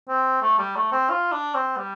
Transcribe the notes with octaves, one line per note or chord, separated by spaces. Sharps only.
C4
A3
G3
A3
C4
F4
D4
C4
G3